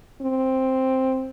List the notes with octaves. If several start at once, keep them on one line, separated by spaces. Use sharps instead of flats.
C4